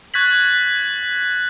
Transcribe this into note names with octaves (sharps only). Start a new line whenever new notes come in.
C#6 F#6 G#6 A6 B6 F#7